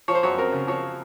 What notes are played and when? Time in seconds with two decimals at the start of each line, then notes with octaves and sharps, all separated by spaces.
0.08 F3 C#5
0.15 C5
0.23 F#2 C#5
0.38 C4 A#4
0.52 C#3
0.67 F3 C#5